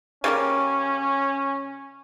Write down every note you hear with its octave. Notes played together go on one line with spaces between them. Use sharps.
C#3 G3 A#3 C#4